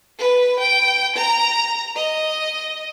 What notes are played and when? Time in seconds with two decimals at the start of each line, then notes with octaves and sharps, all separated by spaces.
0.18 B4
0.59 G5
1.16 A#5
1.96 D#5